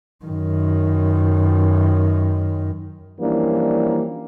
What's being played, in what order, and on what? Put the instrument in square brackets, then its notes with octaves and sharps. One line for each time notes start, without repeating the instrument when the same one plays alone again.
[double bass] F#2 D#3
[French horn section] E3 F3 G3 A#3 C#4 D4